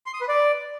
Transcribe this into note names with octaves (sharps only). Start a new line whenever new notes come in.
C6
D#6
B4
D5